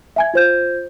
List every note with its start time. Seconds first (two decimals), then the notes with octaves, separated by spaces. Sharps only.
0.16 E5 G#5 G#6
0.34 F4 C5 G6